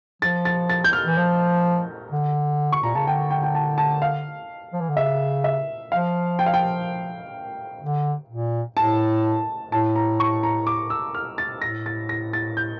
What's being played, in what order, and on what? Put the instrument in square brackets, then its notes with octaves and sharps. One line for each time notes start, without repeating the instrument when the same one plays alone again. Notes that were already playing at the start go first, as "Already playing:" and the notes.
[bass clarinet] F3 [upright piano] A6
[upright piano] A6
A6
G6
F6
[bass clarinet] E3
F3
D3
[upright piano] C#6
[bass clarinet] A#2 [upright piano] A#5
[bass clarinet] C#3 [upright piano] A5
[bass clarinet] D3 [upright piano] G5
[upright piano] G5
G5
A5
A5
F5
[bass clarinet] F3
E3
D3
[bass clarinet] C#3 [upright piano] E5
[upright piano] E5
[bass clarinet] F3 [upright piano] F5
[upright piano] G5
F5
G5
[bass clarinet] D3
A#2
[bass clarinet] A2 [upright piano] A5
[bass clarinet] A2 [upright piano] A5
[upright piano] A#5
C#6
A#5
D6
E6
F6
A6
[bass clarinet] A2 [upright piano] A#6
[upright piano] A6
A#6
A6
G6